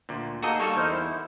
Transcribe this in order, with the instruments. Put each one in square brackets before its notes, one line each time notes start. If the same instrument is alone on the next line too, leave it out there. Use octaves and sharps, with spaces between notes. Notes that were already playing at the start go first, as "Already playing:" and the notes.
[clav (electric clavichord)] D2 A#2
[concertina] A#3 D#4 A4 [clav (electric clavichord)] F#4 G#4 D#5
[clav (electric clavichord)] G3 A#3 A4 [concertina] C#6 E6
[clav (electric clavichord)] E2 [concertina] D#4 A#4 C5
[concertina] E4